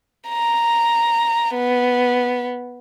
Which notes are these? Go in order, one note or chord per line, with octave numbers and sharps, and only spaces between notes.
A#5
B3